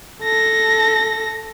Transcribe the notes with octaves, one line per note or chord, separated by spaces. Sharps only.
A4 A#6